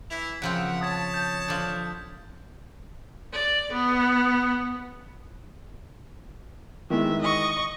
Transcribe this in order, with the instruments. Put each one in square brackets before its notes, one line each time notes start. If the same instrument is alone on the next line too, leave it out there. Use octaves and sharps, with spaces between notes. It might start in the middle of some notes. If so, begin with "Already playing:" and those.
[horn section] E3 E4 [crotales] B6 F7
[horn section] F#2 F#5 [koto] C#3 F3 C4
[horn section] C#5 A5 [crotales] D#6 G#6
[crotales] G6
[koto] D3 F3
[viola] D5
B3
[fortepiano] D#3 E3 G#3 [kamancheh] E5
[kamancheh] D#5 C#6